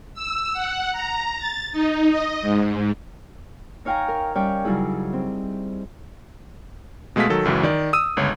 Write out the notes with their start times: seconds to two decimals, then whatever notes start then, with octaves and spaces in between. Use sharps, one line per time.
0.14 E6
0.53 F#5
0.93 A#5
1.39 A6
1.72 D#4
2.11 D#5
2.42 G#2
3.85 D#4 C#5 F5 G5 G#5 A#5
4.08 A#4
4.35 G3 C#4 C#5 D5 F5 G5
4.64 C#3 F#3 G3 D#4 E4 G#4
5.13 C4
7.16 B2 G#3 A3 F5 B6
7.29 D#3 F#3 A4
7.45 C#2 F#2 E3 F#3
7.63 D#3 D5
7.93 D#6 E6 D#7
8.17 G1 C#2 C#5